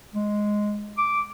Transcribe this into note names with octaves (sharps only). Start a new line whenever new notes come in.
G#3
D6